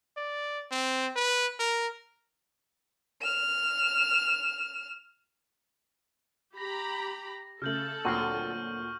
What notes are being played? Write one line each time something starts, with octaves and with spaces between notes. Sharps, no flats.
D5
C4
B4
A#4
F6 E7
G4 A#5 B5 A#6
C#3 A3 A4 F6 G6 F#7
D2 A#2 D3 F#3 C4 C#6 F6